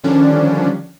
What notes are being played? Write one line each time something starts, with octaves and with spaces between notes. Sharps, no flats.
D3 D#3 F3 G3 C#4 D4